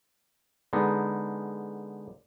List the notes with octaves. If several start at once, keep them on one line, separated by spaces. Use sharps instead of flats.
D3 G#3 B3 D#4